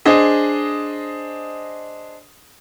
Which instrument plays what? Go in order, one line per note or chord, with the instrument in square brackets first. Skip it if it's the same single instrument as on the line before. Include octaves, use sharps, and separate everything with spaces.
[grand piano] D4 G#4 C5 D#5